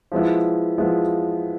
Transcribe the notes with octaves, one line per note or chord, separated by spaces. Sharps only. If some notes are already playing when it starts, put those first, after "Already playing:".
F3 G#3 B3 E4
F3 G#3 B3 E4